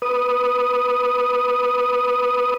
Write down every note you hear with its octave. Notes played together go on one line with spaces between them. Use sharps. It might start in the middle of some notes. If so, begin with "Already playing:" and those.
B4 D#6